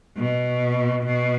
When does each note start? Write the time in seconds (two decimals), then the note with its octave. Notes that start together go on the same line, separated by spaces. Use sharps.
0.17 B2
1.06 B2